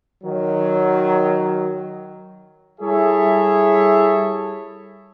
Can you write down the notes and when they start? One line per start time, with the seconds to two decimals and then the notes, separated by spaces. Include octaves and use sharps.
0.24 D#3 F#3
2.81 G3 E4 G#4 A4 C#5 E5